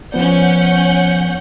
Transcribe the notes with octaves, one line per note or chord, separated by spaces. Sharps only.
F3 B3 C#4 D5 F#5 G6